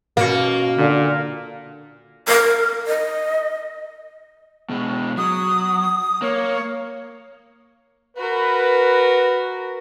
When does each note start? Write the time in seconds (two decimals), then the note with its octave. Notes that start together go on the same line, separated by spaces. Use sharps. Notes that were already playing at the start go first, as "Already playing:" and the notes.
0.17 B2 A#3 C#4 F#4
0.78 A#2 D3
2.27 A#4
2.87 D#5
4.70 B2 G#3
5.17 F#3 D#6
6.22 A#3 C#5
8.17 F#4 A#4 B4